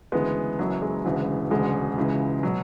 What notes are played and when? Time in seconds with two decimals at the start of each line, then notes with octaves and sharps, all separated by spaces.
0.12 D2 C#3 E3 G#3 B3
0.59 F#1 F#2 E3 F#3
0.82 G#3
1.05 E1 D2 C#3 E3
1.50 E1 D2 C#3 G#3
1.97 C#2 C#3 E3
2.43 B2 F#3